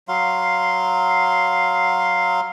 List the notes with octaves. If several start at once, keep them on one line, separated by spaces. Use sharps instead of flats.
F#3 F5 C6